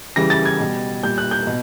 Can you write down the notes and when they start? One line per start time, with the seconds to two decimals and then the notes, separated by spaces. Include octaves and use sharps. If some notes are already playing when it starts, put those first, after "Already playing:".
0.16 C#3 E3 G3 A#6
0.30 A6
0.46 G#6
0.60 B2 G3
1.03 A#2 G3 G6
1.18 F#6
1.31 G6
1.47 B2